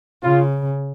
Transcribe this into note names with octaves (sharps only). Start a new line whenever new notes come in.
C#3 F4